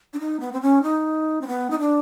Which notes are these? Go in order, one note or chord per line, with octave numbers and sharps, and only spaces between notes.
D4
D#4
B3
C4
C#4
D#4
C4
B3
D#4
D4